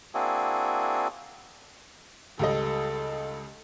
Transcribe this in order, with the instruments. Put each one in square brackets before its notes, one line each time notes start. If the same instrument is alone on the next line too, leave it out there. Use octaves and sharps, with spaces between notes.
[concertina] A#3 C4 D4 E4 F#4 G#4
[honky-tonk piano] C#2 G3 D#5 [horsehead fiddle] A4